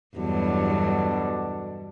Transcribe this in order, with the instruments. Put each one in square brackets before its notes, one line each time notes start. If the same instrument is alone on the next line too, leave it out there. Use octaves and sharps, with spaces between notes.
[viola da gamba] E2 G2 F#3 [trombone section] B2 D3 D4